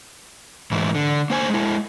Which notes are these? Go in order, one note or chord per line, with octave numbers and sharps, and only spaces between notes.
G#2 E3 E4
D3
A#3 C5 G#5
G#3 E4